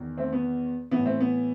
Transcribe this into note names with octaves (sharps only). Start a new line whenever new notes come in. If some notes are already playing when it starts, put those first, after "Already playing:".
Already playing: E2 D#3
A3 C4
B3
A2 E3 B3
A3 C4
B3